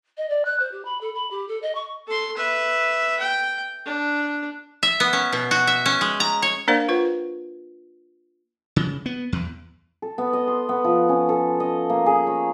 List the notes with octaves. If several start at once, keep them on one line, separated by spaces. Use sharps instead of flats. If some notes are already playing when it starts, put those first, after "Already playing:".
D#5
D5
F#6
C5
G4
B5
A4
B5
G4
A4
D#5
C#6
A4 C6
B4 E5
G5
D4
E5
B3
C#4
B2
F#4
E5
C#4
G#3
A#5
C#5
A#3 D4 A#4 C5 D5 F5
F4 B4 C5 F#5
C#3
B3
E2
A4
B3
D#5
C6
B3
F3
C#4
A4
D#5
A#3
G#4
C#5